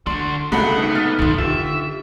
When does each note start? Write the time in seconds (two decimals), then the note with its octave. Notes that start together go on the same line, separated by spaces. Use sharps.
0.07 D3 D4 F#4 C6
0.52 G2 C#3 G#3 A3 B3 F#4 B5
0.78 D#4 A4 B4
0.95 F6 A6
1.19 F#2 B2 D#3 F3 A6
1.38 D3 F4 G4 E5